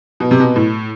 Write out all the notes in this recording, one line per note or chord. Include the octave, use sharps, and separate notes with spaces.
B2
C3
B2
A2